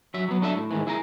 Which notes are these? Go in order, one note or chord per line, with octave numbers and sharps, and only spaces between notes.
F#3 E5
F#3 B3
F#3 D4 A4 D#5 E5
A2
G#2 D#3 E3
E4 G#4 A#4 A#5